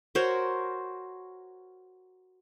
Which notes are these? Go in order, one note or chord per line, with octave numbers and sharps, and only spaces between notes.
F#4 A#4 C5 C#5